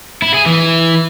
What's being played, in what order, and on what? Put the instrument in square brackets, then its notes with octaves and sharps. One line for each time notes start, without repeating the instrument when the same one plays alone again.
[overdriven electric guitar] E4
G#4
E3